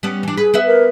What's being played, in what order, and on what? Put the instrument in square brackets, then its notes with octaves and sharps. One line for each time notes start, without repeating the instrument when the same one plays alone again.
[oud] G3 B3 C#4
E3 D4
[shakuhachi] G#4 [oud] B4
[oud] B3 B4 E5
[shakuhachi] A#4